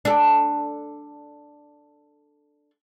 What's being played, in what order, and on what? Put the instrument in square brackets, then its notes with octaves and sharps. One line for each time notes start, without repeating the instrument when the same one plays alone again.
[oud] D4 A4